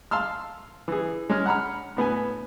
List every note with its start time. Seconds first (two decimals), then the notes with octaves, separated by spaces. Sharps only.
0.11 F5 A5 C6 E6 F6
0.88 E3 G#4
1.30 G#3 C#4 F6
1.46 F#5 A#5 B5 F6
1.97 A2 B3 B4 G#5